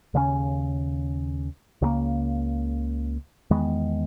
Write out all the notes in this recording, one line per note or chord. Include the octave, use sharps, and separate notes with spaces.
D#2 C#3 G#3 C#4
C#2 C#3 F#3 A#3
E2 D#3 G#3 B3